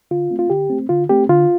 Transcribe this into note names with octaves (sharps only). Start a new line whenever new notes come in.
D3 F4
A3 C4
F4
D3 G4
A3 C4
D3 F4
A3 C4 G4
D3 F4